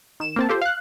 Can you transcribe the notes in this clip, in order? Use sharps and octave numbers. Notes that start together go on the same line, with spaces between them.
D#3 E7
A#3 C4 A5
F4 G4 A4 C5
F5 F#6